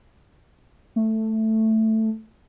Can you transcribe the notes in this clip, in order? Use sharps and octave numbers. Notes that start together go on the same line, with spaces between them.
A3